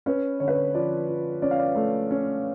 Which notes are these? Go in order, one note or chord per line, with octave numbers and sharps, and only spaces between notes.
C#4 B4
D3 C#5
B4
C#5
F3 D5
F3
C#4 D5
F5
D5
A3
C#4